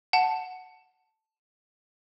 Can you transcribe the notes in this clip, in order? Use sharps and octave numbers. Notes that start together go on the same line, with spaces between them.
F#5 A5